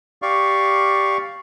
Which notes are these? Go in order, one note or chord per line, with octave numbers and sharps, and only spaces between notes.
G4 D5 F5 C#6